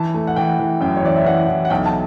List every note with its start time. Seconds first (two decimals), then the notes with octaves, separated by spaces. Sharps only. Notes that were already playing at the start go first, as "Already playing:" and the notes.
Already playing: E3 A5
0.14 A3
0.27 F#5
0.36 E3 G5
0.59 E3
0.81 F#2 G5
0.97 C#5
1.03 E3 D5
1.16 E5
1.26 E3 F#5
1.48 E3
1.65 F#5
1.70 B1 G5
1.86 A5